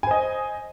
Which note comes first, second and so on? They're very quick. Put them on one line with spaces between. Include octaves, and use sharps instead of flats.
G#5 C5 D#5